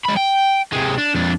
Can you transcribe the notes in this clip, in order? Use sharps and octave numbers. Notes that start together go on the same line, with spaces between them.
G#3 B5
G5
C3 G#3
D4
F2 D4